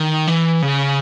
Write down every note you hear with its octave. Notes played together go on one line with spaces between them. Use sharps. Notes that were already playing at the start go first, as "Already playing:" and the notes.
Already playing: D#3
E3
C#3